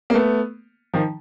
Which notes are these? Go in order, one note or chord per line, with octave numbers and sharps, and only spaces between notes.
A#3
A3 B3
D#3 F3